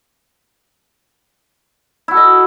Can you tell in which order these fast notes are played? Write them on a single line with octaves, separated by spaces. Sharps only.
E4 F#4 A4 D#5